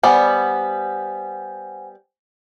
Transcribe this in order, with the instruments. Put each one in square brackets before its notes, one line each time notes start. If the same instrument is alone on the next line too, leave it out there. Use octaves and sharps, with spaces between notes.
[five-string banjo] G3 B3 D5 [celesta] C5 F#5 G#5